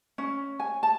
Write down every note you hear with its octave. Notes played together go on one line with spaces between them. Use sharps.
C#4
G#5
A5